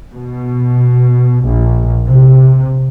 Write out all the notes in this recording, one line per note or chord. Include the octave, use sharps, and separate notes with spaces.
B2
A#1
C3